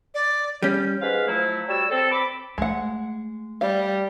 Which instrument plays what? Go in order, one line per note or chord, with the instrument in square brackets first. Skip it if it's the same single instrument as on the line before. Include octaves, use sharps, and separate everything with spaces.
[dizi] D5
[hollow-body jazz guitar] G3 C#4 [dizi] G6
[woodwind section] G#2 B4 F5
F3 F#3 A3 E4
G3 F#4 C#5 E6
C4 A4
B5 D6
[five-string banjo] G#3 F#5 [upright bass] A3
[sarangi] G3 [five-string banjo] F5